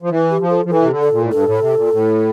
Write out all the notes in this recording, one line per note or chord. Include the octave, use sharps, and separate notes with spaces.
F3
E3
G4
F3
A4
F3
E3 A4
C3
D3
A4
A#2
A2
G2 A4
A2
C3
A#2
A2